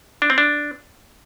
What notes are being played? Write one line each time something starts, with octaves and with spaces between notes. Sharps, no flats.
D4
C4
D4